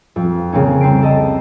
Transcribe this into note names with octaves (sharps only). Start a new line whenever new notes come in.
F2
C#3 A#3 C4 C#4
C2 C4 C5 C7 D7
A4 D#5 A5